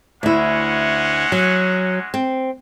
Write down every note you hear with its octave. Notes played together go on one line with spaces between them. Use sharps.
D2 G#3 C#4 E4 F#5
F#3
C4